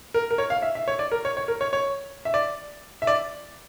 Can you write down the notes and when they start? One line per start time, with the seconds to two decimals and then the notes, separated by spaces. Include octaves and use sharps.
0.14 A#4
0.31 A#4
0.38 C#5
0.50 F5
0.62 E5
0.75 E5
0.88 C#5
0.99 D5
1.12 A#4
1.25 C#5
1.37 C#5
1.48 A#4
1.61 C#5
1.73 C#5
2.25 E5
2.34 D5
3.02 E5
3.07 D5